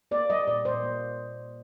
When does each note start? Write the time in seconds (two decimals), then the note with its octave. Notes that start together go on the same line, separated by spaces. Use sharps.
0.11 A#3 D5
0.30 G3 D#5
0.47 A#2 D5
0.65 A#2 C5
0.83 A#3